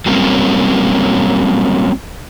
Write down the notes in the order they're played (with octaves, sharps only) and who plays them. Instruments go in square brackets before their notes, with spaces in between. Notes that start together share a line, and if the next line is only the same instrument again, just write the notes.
[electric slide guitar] F#3 G3 A#3 C4 C#4